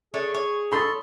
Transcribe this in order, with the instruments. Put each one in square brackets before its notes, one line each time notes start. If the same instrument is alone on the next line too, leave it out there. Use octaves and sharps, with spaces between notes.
[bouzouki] A3 D4 C#5 [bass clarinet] G#4
[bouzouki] C#5
[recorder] A4 [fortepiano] B5 C6 D#6